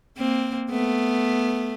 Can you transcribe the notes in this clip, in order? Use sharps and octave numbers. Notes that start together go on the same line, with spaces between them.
A#3 C4
A3 B3